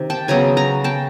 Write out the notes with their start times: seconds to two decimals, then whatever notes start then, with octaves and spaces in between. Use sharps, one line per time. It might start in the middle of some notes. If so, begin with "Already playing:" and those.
Already playing: C3 D#3
0.10 G5 A5
0.28 C#3 F#3 B3 G#5 A#5
0.57 G#5 A#5
0.84 G5 A5